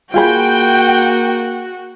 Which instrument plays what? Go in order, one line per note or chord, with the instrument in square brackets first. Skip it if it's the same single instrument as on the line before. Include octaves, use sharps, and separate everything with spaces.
[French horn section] A#3 [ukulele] F4 G#4 B5 [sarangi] F#4 [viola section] G5